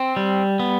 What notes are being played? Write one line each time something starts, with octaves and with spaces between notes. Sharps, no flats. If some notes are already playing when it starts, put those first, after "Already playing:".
Already playing: C4
G3
B3